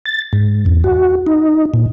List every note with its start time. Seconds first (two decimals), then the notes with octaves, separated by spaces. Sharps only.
0.06 A6
0.33 G#2
0.66 E2
0.84 F#4
1.27 D#4
1.74 A#2